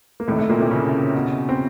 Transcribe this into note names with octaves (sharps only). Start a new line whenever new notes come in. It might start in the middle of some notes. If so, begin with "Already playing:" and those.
A#3
A2 C3 D#3 A3
A2 A3
A#2 A#3
C3 C4
C#3 C#4
B2
C4